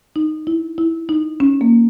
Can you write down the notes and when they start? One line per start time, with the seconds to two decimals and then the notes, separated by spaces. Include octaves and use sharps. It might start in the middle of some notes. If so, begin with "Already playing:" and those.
0.16 D#4
0.47 E4
0.78 E4
1.09 D#4
1.40 C#4
1.61 A#3